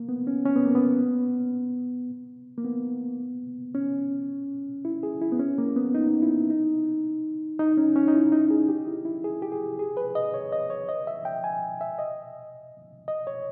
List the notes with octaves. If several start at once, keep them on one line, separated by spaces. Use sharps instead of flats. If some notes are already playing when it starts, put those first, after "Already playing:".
Already playing: A#3
B3
C#4
C#4
B3
A#3
B3
A#3
B3
C#4
E4
G#4
E4
B3
C#4
A#3
B3
D#4
E4
D#4
D#4
C#4
C#4
D#4
E4
D#4
G#4
G4
E4
E4
G#4
G4
G#4
G#4
B4
D#5
C#5
D#5
C#5
D#5
E5
G5
G#5
E5
D#5
D#5
C#5